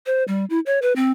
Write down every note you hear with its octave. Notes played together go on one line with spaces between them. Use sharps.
C5
G3
E4
C#5
B4
C4